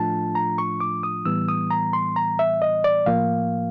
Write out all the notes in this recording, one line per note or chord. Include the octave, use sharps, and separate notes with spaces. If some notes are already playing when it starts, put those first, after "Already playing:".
Already playing: A2 F3 A3 D4 F4 A5
A#5
C#6
D6
D#6
A2 E3 G3 B3 E6
D#6
A#5
C6
A#5
E5
D#5
D5
A2 F3 A#3 F5